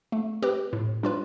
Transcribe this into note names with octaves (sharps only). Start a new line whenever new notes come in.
A3
C4 G4 B4
A2
G3 D4 F4 B4